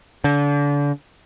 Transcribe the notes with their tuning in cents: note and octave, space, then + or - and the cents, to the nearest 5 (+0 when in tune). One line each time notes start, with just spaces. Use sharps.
D3 -30